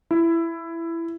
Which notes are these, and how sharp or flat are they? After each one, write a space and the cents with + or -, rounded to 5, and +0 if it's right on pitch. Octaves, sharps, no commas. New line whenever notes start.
E4 +15